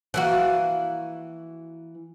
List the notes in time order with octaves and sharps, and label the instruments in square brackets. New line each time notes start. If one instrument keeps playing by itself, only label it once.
[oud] E3 A#3 F#4